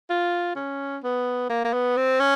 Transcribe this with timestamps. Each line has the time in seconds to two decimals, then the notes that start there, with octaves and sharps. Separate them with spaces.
0.10 F4
0.56 C#4
1.04 B3
1.50 A#3
1.65 A#3
1.73 B3
1.97 C4
2.20 C#4